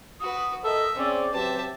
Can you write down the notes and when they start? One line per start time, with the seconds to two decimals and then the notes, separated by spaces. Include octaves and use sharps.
0.20 F#4 B4 D#6
0.64 A4 A#4 D#5 E5 E6
0.96 C4 C#4 G#4 C5 D5
1.33 F#3 C4 G4 B4 E5 A5